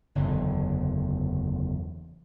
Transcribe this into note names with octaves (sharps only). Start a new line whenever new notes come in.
F#1 E2 D3